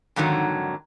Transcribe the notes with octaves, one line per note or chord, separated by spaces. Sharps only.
F2 G#2 D3 D#3 F#3